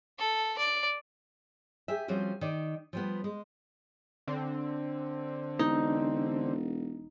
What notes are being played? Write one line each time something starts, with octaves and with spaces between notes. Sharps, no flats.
A4
D5
G4 G#4 E5
F3 G3 C4 C#4 F#4
D#3 D5
F3 G3 B3
G#3
D3 C4
E1 D#4